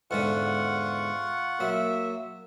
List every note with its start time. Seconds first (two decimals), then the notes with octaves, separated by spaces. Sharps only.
0.11 E2 G#2 D3 F4 F#5 C#6
1.60 F#3 A#3 E5